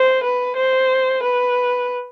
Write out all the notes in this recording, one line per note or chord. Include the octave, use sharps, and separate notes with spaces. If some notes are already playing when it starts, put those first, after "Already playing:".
Already playing: C5
B4
C5
B4